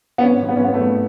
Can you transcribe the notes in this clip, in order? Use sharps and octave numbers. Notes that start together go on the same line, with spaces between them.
B3
G#1 C#4
G#1
B3
C#4
G#1 B3
A3
G#1